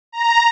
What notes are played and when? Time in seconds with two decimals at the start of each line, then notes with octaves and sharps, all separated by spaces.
0.12 A#5